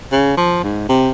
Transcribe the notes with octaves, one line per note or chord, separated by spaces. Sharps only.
C#3
F3
G#2
C3